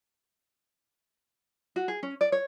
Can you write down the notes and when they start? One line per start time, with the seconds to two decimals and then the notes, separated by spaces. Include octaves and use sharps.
1.76 F#4
1.88 G#4
2.03 C#4
2.21 D5
2.32 C#5